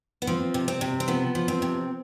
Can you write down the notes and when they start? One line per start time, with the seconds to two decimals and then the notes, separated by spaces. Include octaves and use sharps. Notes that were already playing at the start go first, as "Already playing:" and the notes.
0.22 B3
0.27 F3 C4
0.54 C3
0.68 C4
0.81 C3
1.00 C4
1.08 F3 B3
1.35 F3
1.48 C4
1.62 C3